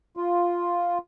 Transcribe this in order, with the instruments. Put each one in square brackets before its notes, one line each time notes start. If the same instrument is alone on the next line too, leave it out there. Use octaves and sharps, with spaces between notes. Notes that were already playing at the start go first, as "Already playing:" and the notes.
[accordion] F4